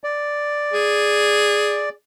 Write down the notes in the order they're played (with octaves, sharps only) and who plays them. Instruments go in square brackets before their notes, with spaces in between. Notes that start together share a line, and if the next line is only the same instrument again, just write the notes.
[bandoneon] D5
[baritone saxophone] G#4